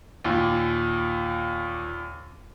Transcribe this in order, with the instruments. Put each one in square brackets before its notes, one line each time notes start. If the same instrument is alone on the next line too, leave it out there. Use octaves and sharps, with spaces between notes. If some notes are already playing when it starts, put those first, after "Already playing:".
[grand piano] D#2 A#2